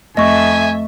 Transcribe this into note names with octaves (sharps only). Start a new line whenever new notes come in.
F2 A3 D#5 E5 G#5 A5 C#6